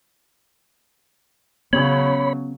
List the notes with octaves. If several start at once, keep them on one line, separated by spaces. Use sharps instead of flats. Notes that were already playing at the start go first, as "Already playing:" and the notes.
C#3 F#3 B3 C#4 C#5 B5